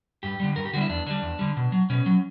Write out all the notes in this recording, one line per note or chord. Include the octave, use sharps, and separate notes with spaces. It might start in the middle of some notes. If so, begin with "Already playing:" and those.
G2 G4
D3 G3
G2 A#4
G4
D3 G3 E4 F#4
E2 D4
D3 G3 D4
E2
D3 G3
B2
F#3
B2 C#4
F#3